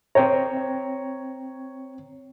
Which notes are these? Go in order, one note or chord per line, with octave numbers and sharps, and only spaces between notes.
C4 C#5 G5 A#5